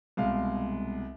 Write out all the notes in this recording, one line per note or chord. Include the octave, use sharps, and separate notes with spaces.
C2 B2 G#3 F5